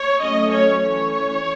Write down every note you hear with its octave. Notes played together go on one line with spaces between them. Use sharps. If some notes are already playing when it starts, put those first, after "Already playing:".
Already playing: C#5
F#3 A3 C#4 D#5
C#5
E3 A3 C#4 C#5